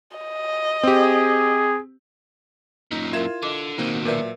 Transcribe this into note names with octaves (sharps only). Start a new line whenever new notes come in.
D#5
C4 G4 G#4
F#2 A#2 D#4
E4 F4 A#4 E5 G#6 E7
D3 D#5 D6
D#2 B2 A#3 C4 D#4
A#2 F#3 A#4 B4 D5 E5